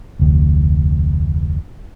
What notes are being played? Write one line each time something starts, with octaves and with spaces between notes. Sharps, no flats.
F1 D2